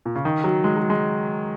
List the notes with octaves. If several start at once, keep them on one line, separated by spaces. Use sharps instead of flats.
A#2
C#3
D#3
F#3
G#3
F#3
G#3